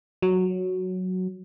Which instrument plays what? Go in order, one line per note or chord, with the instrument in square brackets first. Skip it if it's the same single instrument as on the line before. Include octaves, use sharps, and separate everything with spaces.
[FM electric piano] F#3